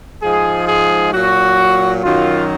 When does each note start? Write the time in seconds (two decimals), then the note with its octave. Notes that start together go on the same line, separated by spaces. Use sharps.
0.22 G#2 F3 G#3 G#4
0.68 G#4
1.13 A#2 F#3 F#4
2.03 F#2 D#3 F#3 F4